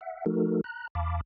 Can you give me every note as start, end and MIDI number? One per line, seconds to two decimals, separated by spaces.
0.01 0.25 76
0.01 0.25 78
0.26 0.61 53
0.26 0.61 57
0.26 0.61 63
0.26 0.61 66
0.26 0.61 69
0.26 0.61 70
0.64 0.88 82
0.64 0.88 90
0.95 1.21 40
0.95 1.21 77
0.95 1.21 81
0.95 1.21 83
0.95 1.21 86